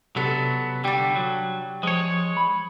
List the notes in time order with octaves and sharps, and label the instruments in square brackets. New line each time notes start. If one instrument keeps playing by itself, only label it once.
[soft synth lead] C3 [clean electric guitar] F#3 B3 [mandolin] C4 D4 A4
[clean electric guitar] D3 G3 [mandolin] D4 G4
[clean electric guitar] F#3
[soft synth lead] F3 [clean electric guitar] G#3 C#5
[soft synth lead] B5